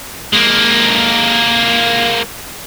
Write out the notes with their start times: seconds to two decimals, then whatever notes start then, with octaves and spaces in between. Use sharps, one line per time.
0.33 G#3 A#3